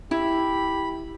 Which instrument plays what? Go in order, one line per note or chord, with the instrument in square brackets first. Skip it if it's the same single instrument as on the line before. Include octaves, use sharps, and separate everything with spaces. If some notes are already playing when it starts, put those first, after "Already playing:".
[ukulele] E4 [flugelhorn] G4 [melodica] B5